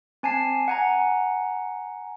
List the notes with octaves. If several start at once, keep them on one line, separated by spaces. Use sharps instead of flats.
C4 G#5 A5 C7
F#5 G#5 A#5